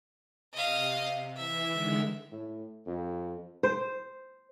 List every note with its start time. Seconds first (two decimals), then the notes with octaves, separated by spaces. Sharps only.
0.53 C3 D#5 F5
1.36 E3 E5
1.70 D3 D#3 G#3
2.31 A2
2.86 F2
3.63 C5